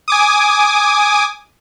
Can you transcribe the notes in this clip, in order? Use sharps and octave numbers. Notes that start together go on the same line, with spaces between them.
G#5 D6 D#6